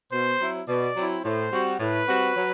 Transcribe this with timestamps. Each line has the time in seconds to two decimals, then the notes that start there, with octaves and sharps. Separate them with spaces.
0.12 B2 C5
0.40 F#3 C4 E4
0.68 B2 D5
0.97 F#3 C4 E4
1.24 A2 C5
1.52 G3 C4 F#4
1.80 A2 B4
2.08 G3 C4 F#4
2.36 F#3